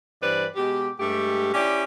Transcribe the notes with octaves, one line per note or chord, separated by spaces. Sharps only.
G2 E3 B4 C5 D5
B2 G#3 G4
G2 G#3 A3 G4
C#4 E4 G4 D5 G5